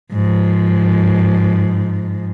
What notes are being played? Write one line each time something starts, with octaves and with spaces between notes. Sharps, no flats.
G#2 F3